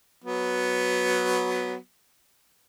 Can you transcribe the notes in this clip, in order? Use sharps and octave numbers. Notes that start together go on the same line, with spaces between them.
F#3 B3